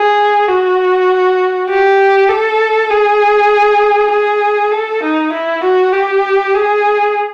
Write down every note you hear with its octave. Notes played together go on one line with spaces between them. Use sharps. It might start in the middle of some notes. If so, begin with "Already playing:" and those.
Already playing: G#4
F#4
G4
A4
G#4
G#4
A4
D#4
E4
F#4
G4
G#4